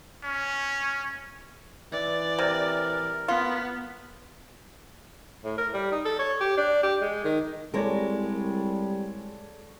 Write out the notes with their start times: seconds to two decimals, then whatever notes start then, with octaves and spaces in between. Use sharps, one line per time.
0.24 C#4
1.92 E3 D5
2.39 C3 A#4
3.28 B3 F4
5.44 A2
5.58 A#4
5.73 G3
5.92 D#4
6.05 A4
6.19 C#5
6.41 G4
6.58 D4
6.83 G4
7.01 G#3
7.24 D#3
7.74 C2 G3 G#3 A4 A#4 C#5 D5